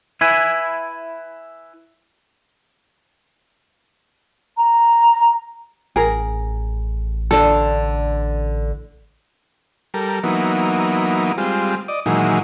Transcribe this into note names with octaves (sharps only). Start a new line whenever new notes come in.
E4 B4 E5 G#5
A#5
A1 G#4 A#4
D3 D4 A4 C5
G3 A4 A#4
E3 F#3 A#3 B3 D#4
G3 G#3 C4 F4
D5 D#5
A#2 D#3 E3 F#3 G#3